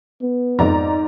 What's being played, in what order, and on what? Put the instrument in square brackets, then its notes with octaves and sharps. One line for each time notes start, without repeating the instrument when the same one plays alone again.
[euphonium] B3
[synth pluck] F2 [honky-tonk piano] G#2 D5 A#5